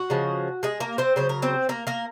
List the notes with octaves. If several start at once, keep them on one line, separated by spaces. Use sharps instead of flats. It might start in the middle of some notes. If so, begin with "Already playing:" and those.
Already playing: F#4
C#3 F3 G#3
G#3 G#4
A#3 A#4
C4 C5
C#3 F#3 C5
A#4
C4 C5
A#3 A#4
A#3 A#4